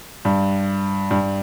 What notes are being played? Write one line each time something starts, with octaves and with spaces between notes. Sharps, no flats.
G2
G2